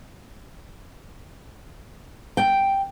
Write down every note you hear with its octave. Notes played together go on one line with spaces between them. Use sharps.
G5